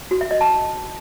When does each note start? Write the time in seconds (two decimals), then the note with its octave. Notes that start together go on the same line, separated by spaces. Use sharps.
0.11 F#4
0.21 E5
0.31 D#5
0.41 A5